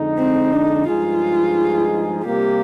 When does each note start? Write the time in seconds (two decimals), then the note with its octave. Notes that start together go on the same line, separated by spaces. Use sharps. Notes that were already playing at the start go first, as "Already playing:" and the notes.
Already playing: F2 D3 G#3 D#4
0.18 C4
0.52 D4
0.87 G2 F3 G#3 D#4 F4 G#4
2.25 C3 G3 A#3 G4